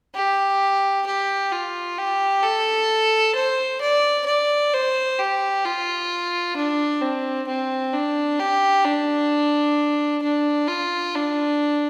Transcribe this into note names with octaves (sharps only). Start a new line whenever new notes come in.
G4
G4
F4
G4
A4
C5
D5
D5
C5
G4
F4
D4
C4
C4
D4
G4
D4
D4
F4
D4